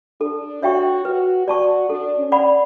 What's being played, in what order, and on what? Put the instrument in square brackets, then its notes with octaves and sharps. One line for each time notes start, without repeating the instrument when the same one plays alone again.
[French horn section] D4 [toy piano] A4
[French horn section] F#4 [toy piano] C#5 E5 G5 C#6
[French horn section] F#4 [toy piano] B4
[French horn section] F#4 [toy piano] D5 A5 C#6
[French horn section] D4 [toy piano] A4
[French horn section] C#4
[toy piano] D5 F#5 B5